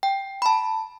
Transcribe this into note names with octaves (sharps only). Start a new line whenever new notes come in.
G5
B5
A5